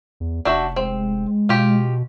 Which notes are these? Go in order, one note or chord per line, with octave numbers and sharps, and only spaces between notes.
E2
F1 D4 F#4 E5 G6
G#3 C4
B2 F4 G4